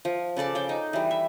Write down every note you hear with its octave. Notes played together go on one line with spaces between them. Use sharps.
F3
C#3 A4 D5 A5
C#3 G5 D6
D#4
E3 G3
E5